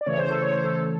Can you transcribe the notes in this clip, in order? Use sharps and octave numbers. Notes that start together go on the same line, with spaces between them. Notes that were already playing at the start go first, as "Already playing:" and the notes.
D5
C#3 E3 A3 C#5
C5
A4
C#5
C5
A4